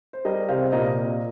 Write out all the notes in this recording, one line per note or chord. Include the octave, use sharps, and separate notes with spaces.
C5
G3 A#4 D#5
C3 C5 F5
A#2 A#4 D#5